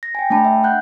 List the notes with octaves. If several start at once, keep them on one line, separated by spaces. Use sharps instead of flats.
A#6
G5 G#5
A3 D4 G5 A5 B5
E5
F#5 F#6 G6